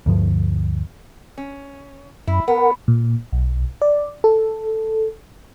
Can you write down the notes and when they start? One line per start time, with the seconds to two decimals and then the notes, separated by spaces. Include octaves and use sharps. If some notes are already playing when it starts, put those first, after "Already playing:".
0.06 D2 G2 F3
1.38 C#4
2.28 F#2 E4
2.48 B3 A#4 F#5
2.88 A#2
3.33 B1
3.82 D5
4.24 A4